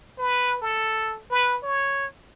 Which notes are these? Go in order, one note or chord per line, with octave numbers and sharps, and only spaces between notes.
B4
A4
B4
C#5